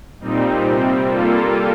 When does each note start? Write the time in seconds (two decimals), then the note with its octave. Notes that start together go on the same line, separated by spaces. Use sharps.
0.21 A#2 G3 C4 D#4
0.64 C3 G3 C4
1.07 G3 A#3 F4 A4